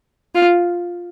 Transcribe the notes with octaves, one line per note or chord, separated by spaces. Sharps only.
F4